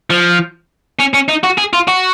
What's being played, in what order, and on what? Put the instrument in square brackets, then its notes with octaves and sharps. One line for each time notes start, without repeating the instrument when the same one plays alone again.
[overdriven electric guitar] F3
C#4
C#4
D#4
F#4
G#4
F4
F#4